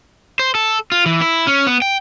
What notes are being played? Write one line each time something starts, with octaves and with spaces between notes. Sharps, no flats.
C5
A4
F4
E3
E4
C#4
B3
G5